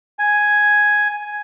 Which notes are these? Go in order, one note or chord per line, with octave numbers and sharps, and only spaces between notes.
G#5